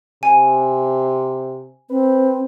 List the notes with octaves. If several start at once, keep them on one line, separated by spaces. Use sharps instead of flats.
C3 G#5
C4 B4